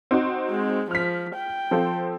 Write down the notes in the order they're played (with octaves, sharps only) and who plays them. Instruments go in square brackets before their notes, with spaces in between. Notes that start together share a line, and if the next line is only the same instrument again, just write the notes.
[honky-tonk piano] C4 D#4 F#4
[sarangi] G#3
[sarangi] F3 [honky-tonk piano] F6 B6
[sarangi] G5
[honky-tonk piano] F3 C4 A4